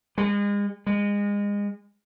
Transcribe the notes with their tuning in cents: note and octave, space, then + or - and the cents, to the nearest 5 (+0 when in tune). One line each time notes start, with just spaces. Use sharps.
G#3 -35
G#3 -30